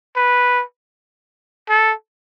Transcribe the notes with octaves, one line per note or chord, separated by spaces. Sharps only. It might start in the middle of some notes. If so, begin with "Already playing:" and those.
B4
A4